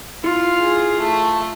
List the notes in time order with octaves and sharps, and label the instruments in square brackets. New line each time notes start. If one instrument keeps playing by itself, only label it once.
[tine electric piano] E4 [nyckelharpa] F4
[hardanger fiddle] G#4
A3